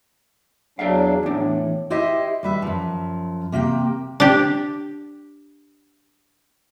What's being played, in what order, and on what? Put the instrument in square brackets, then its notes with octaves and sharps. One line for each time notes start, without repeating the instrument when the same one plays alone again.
[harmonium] E2 F#3 D4 [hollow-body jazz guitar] G#4 E5 F5
[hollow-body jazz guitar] E2 D4 [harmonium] A2
[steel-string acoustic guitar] E4 G4 C5 D#5 E5
G3 B4 E5
F#2 F3
C3 A#3 G4 G5
[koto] D4 G4